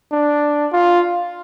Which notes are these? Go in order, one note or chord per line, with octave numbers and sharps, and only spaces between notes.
D4
F4